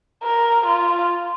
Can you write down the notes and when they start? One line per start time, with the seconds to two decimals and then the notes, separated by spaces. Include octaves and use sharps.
0.24 A#4
0.66 F4